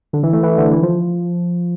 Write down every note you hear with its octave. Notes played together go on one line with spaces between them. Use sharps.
D3
E3
A3
E3
D3
E3
F3